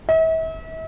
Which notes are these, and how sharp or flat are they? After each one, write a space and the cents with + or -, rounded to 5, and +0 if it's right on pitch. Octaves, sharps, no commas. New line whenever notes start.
E5 -40